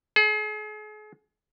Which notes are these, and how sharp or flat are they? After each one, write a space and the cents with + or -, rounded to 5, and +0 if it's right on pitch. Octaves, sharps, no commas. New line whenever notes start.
G#4 +40